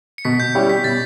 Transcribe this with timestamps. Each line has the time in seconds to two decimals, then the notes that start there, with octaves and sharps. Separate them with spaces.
0.18 C#7
0.25 B2 B6
0.40 G6
0.55 G3 C#4 E4 G4
0.69 B6
0.84 B2 A6